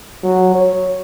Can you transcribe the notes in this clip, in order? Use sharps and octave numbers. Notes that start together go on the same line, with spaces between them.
F#3
C#5